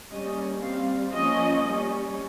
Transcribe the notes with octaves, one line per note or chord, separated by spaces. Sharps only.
G3 A#3 C#4 D#5
G3 C4 F5
F3 A#3 C#4 D#5
G3 C#4